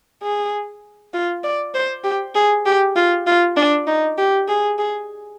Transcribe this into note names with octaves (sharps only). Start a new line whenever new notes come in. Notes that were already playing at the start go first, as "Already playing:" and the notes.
G#4
F4
D5
C5
G4
G#4
G4
F4
F4
D4
D#4
G4
G#4
G#4